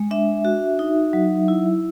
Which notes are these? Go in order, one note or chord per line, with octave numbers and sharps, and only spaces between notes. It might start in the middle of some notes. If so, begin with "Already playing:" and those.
Already playing: G#3
D4 E5
F#4
D#4
F#3
E4